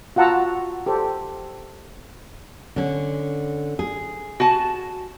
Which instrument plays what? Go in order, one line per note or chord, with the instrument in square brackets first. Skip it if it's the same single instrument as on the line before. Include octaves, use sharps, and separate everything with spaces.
[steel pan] F4 F#4 F#5 A5 A#5 E6
G4 A4 C5
[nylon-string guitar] D3 C#4
G#4
[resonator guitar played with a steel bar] F#4 G#5 A5